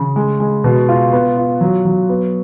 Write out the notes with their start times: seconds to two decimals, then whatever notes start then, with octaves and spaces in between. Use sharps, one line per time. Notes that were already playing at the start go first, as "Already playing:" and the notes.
Already playing: C#3
0.16 G#3
0.40 G#3
0.64 B2
0.89 F4
1.13 B3
1.37 F4
1.61 F#3
1.85 F#3
2.09 B3